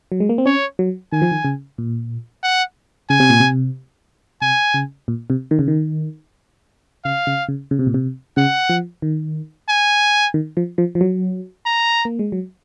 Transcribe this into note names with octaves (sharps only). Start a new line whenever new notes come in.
F#3
G#3
A#3
C4
C#4 C#5
F#3
D#3 G#5
F3
D#3
C#3
A#2
F#5
C#3 G#5
C3
A#2
C3
C3 G#5
C#3
A#2
C3
D#3
C#3
D#3
C#3 F5
C#3
C#3
C#3
C3
A#2
C3
C#3 F#5
F3
D#3
G#5
D#3
F3
F3
F3
F#3
A#5
A#3
G#3
F#3